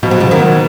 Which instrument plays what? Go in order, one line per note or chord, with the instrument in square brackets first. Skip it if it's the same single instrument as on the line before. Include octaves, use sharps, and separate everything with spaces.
[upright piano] B2 [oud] F3
[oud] F#3
C#3 F3
[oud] D#3 F#3 [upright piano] A#3